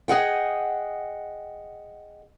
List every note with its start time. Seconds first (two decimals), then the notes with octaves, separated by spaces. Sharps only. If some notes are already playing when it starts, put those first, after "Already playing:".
0.08 G#4 D#5 F#5 G5